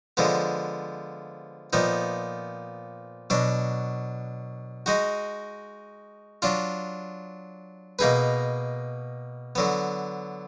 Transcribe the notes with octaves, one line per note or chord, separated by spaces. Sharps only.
D3 F3 G#3 B3
A#2 F3 B3 D#4
B2 F#3 D4
G#3 D#4 F#4
F#3 D4 F4
B2 A#3 D#4 G#4 B4
D3 F#3 B3